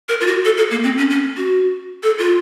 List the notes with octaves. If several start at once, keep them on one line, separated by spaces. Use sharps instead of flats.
A#4
F4
F#4
A4
A4
A#3
C4
C#4
C#4
F#4
A4
F4